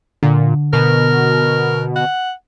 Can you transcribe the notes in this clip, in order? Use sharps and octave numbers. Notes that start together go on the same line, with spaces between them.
A#2 D3
B2 A#4
F#5